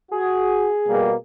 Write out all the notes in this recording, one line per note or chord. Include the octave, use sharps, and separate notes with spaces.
F#4 G#4
B2 G3 A#3